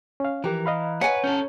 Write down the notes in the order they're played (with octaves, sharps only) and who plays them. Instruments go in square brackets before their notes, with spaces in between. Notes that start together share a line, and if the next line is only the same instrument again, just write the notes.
[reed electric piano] C#4 F5
[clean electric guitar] E3 [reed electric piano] F3 G4 A#4 [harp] A#5
[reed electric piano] D#5 F5 B5
[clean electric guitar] B4 [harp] C#5 [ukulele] F#5 G#5
[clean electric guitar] C#4 A4 [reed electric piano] G6